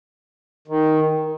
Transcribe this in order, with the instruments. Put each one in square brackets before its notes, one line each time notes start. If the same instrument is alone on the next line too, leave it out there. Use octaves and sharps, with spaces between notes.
[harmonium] D#3